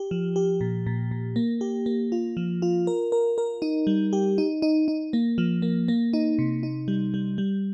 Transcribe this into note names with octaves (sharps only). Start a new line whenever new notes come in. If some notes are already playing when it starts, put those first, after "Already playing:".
Already playing: G4
F3
G4
A#2
A#2
A#2
A#3
G4
A#3
F4
F3
F4
A#4
A#4
A#4
D#4
G3
G4
D#4
D#4
D#4
A#3
F3
A#3
A#3
D#4
C3
D#4
G3
G3
G3